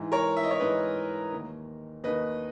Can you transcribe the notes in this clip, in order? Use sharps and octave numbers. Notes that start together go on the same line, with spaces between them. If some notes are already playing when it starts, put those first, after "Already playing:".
Already playing: G#2 E3
A#4 C#5
E5
D#5
C#5 E5
G#2 E3 B4 D#5
D#2 D#3
D#2 D#3 B4 D#5